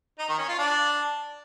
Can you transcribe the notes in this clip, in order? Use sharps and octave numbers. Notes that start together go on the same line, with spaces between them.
D#4
D#3
C#4
F4
D4